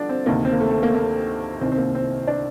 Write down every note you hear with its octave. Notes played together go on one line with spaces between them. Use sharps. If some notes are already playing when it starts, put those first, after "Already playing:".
Already playing: G2 D3 F3 D4
C4
D2 C3 D#3 A#3
C4
A#3
A3
A3
A#3
A#3
C2 C3 D#3 C4
C4
A#3
C4
D4